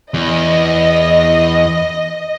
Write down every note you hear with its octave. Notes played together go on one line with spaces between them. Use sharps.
E2 D#5